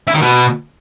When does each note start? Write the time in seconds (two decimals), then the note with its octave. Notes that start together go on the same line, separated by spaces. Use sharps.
0.07 E4
0.14 D#3
0.21 B2